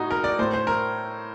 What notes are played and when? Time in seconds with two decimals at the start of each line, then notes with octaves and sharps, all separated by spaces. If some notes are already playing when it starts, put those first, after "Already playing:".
Already playing: A2 D#4 F#4
0.11 A#4
0.24 D5
0.39 A2 C5
0.54 C5
0.67 A#4